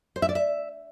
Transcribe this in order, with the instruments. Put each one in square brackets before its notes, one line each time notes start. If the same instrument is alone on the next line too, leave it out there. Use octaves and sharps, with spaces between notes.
[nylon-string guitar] C5
E5
D5
E5